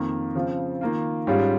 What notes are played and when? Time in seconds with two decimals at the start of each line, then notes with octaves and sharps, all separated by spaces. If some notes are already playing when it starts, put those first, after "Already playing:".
Already playing: F2 D#3 A#3
0.35 C#3 F3 C4
0.81 D#3 A#3 F4
1.27 G#2 G3 C#4 F4